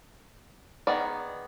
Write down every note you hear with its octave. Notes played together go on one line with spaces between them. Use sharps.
D#3 B3 G#4 D5